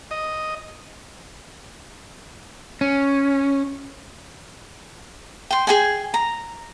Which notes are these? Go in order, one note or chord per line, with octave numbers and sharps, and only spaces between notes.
D#5
C#4
G5 C6
G#4 G5 G#5
A#5